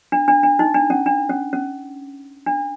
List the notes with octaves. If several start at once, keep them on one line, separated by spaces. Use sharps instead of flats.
D4
D4
D4
D#4
D4
C#4
D4
C#4
C#4
D4